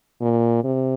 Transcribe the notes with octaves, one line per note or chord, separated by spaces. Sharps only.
A#2
C3